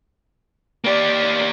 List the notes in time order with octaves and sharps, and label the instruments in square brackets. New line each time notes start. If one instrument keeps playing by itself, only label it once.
[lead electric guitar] A#3 G4 [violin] D5